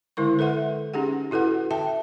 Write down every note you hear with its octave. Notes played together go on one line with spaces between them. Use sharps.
D3 G#3 E4 A#4 C#6
A4 B4 E5 F#5 C6
C#4 D#4 G4 G#4 F#5
E4 F#4 A4 B4 F#5
E5 G5 A5